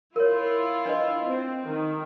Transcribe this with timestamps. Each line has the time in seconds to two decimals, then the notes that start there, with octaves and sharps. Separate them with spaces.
0.16 E4 F4 A#4 C#5
0.86 D4 B4 D#5
1.26 C4
1.67 D#3